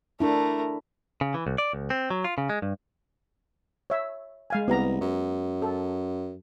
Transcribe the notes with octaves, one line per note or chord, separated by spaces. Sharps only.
A3 D4 E4 A#4
C#3
E3
C2
D5
C#2
C4
F#3
F4
C#3
G#3
G2
C#5 E5
G#3 F5 G#5
C2 B3 G4 A#5
F#2
A4